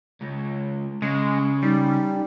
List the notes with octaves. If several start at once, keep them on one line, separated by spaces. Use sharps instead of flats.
C#2
C#3 G#3
G3 D#4